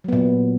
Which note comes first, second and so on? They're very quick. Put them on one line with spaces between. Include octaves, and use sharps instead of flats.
F#3 B3 A#2